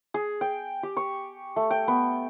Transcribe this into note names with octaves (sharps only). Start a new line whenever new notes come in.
G#4
G5
G4
C#6
A3
G5
B3